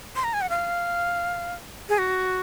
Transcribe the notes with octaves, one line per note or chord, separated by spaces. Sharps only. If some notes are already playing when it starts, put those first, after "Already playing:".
C6
A#5
G#5
F#5
F5
G#4
F#4